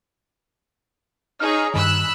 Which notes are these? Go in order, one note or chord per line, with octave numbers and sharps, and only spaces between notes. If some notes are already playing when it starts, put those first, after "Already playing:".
D#4 G#4 C#5 F6
G2 D#3 B5 E6 F#6